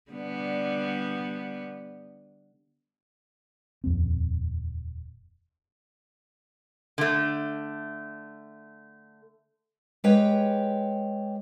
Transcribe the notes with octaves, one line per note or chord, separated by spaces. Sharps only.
D3 G3 B3
D#1 F2 C4
D3 A3
G#3 G4 B4 C#5 G5